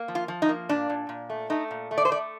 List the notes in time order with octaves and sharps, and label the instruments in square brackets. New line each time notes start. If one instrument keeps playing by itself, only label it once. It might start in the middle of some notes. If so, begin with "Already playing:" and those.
Already playing: [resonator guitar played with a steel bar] A#3
F3
F4
F3
D#4
A#3
A#2 D4
A#2
A#2
A3
A3 D#4
A#2
A3
D5
C5
A3 D5